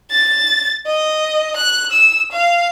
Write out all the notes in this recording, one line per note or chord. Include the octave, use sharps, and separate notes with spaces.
A6
D#5
F#6
E6
F5